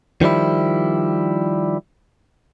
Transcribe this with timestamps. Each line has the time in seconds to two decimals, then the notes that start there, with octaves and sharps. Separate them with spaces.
0.21 D#3 F3 G3 E4